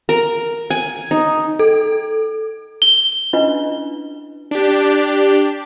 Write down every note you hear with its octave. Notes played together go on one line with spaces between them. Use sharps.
A#4
G#5
D#4
A4
G7
C#4 D4 E4 F4 B4 D#5
D4 G4